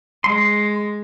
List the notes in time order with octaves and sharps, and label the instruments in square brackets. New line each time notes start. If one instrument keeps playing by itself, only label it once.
[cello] G#3 [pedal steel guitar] C6